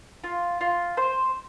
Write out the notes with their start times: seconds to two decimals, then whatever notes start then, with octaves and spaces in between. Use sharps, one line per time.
0.24 F4
0.61 F4
0.97 C5